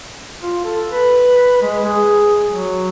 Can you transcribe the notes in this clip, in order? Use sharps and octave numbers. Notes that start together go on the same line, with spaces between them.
F4
A4
B4
G#3
G#4
F#3